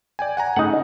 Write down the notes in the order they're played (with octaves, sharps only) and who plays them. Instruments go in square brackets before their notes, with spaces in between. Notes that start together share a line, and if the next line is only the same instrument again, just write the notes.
[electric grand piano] D5 G5 G#5
F#5 G#5 A#5
[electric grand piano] C#3 A3 [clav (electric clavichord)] D#4 F#5